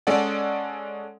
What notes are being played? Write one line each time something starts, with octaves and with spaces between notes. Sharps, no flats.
G#3 C#4 A4 D5 F#5